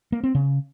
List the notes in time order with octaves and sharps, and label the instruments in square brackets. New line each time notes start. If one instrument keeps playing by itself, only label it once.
[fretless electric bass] A#3
C4
C#3